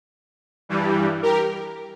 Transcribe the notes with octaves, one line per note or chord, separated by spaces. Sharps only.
G2 E3 G3
G4 A#4